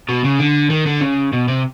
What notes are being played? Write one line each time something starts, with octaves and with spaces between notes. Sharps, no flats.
B2
C#3
D3
D#3
D3
C#3
B2
C3